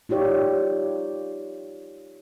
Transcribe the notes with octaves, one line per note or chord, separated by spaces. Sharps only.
D#4 F4 G4 C#5 D5